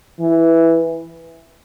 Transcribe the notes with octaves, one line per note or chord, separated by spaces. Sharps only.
E3